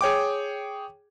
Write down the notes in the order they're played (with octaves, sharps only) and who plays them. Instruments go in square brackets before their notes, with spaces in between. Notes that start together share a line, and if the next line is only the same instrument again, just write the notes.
[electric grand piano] G#4 C#5 G5 D6